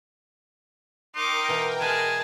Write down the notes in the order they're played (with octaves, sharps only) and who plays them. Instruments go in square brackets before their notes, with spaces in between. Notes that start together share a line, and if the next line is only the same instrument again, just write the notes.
[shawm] D#4 [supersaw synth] A#4 G5 [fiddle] C6 D6
[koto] B2 E3
[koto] G#3 B4 [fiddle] G#4 A5 [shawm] G#5